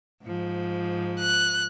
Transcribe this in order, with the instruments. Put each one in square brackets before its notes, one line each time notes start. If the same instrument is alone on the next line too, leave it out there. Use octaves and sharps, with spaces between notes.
[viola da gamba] G#2 F3
[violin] F#6